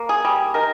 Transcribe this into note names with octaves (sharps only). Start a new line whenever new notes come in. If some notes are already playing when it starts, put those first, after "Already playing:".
Already playing: A#3
G#4
G3
D#3 A#4